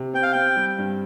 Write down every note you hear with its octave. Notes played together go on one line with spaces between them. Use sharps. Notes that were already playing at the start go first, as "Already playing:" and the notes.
Already playing: C3
C4 G5
F5
C4 G5
G3
G2